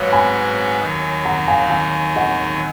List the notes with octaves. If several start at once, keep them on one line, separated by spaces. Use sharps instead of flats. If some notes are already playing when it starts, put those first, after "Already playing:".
Already playing: G#2 F#3 B3 C#5 F5
G#5 B5
D#2 D#3 F#3
F#5 A#5
F5 G#5
F5 G#5
D#5 F#5